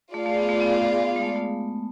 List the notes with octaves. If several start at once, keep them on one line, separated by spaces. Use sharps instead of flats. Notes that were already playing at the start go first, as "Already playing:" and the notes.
A3 F4 G#4 D5 F5
A3
B3
A3
B3
G#3
A3
A3